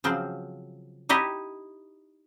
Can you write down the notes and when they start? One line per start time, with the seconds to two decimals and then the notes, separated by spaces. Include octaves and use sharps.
0.04 C#3 F3 F#3 C4
1.09 D#4 E4 G4 D#5